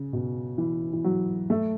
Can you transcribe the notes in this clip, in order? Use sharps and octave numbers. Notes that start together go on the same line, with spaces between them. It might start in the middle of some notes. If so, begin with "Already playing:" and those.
Already playing: C#3
B2
E3
E3
F#3
A3